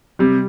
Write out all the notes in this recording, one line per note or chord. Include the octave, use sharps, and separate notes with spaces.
C3 G3